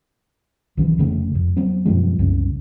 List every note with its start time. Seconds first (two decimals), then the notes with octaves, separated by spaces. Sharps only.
0.77 B1 D#3 E3
0.98 F1 C#3 A3
1.35 F2
1.57 F#3 B3 C4
1.85 F#2 B2 F3 G#3
2.19 C2 F#2 C#3